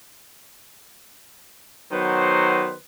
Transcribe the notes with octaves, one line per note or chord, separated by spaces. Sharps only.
D#3 F#3 B3 B4 C5